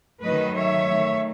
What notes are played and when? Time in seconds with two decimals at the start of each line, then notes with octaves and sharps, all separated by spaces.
0.23 D#3 F#3 A3 B4 D#5
0.56 C#5 E5
0.90 D#3 A3